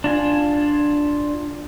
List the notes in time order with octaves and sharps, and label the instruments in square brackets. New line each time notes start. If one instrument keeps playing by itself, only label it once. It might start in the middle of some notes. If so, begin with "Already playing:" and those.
[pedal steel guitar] D4 F4 G#5